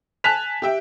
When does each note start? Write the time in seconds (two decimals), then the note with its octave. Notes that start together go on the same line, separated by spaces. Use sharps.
0.24 G#5 A5 F#6 B6 F7
0.62 G4 E5 G5